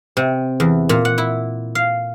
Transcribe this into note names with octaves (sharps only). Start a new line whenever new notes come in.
C3
E2
A#2
F#5
E4
F5